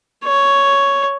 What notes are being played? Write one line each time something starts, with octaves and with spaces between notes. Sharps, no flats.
C#5